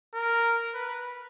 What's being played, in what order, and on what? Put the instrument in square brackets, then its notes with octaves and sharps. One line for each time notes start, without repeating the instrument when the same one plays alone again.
[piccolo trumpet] A#4
B4